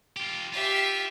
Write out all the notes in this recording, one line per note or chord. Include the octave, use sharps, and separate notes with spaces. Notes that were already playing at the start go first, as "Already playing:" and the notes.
F4 G4
F4 G4 E5